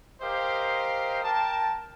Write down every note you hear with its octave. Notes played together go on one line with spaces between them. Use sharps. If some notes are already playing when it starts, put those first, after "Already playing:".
G4 A#4 C5 D#5 F5
A#4 G5 A5